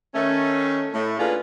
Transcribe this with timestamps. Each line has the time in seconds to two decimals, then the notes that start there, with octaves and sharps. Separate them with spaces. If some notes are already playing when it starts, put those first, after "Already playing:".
0.14 D#3 A3 C#4
0.94 A2 A3
1.19 A#3 C#4 D4 F4 G#4 B4